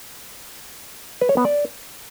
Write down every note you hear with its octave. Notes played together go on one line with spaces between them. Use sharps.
B4
C#5
B3
D5